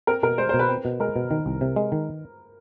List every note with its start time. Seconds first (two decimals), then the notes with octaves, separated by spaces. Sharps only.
0.07 C4 A#4
0.23 B2 A#4
0.38 G#3 C5
0.49 C5
0.54 B2
0.59 B4
0.69 C4
0.85 B2
1.00 G#3 A#4
1.16 B2
1.31 D#3
1.46 C2
1.61 C3
1.76 G#3
1.92 D#3